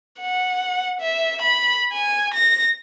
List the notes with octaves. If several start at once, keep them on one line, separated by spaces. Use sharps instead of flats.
F#5
E5
B5
G#5
A#6